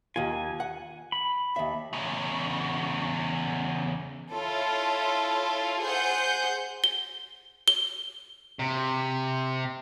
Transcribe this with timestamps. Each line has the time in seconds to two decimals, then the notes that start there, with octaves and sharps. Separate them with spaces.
0.16 D#2 F4 G#5
0.60 F#5
1.12 B5
1.56 D#2 E5
1.93 E2 C#3
4.32 E4 F4 A4 C#5
5.82 G#4 C5 F#5 G6
6.84 G7
7.68 G7
8.59 C3